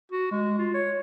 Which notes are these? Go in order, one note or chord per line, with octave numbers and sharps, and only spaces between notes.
F#4
G#3
F4
C#5